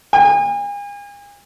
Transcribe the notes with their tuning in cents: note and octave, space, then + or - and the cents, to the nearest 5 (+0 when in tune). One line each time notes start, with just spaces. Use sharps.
G#5 -40